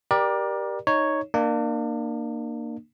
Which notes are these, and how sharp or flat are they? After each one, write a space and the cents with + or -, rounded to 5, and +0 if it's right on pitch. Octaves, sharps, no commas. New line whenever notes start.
G4 +0 A#4 +30 D5 +15
D#4 +0 C#5 +0
A#3 +0 D4 +40